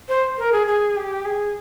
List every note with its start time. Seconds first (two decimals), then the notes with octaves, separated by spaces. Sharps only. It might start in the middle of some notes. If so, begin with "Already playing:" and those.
0.09 C5
0.38 A#4
0.52 G#4
0.67 G#4
0.96 G4
1.25 G#4